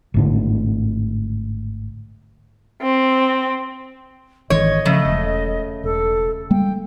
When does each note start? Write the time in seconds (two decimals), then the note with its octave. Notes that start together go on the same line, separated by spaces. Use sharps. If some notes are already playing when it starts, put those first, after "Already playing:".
0.14 G#1 A2 D3
2.82 C4
4.50 G#1 D#3 E3 C#5 D#5
4.86 C#3 F3 A3
5.05 E1
5.84 E1 A4
6.50 G3 G#3 A#3 G5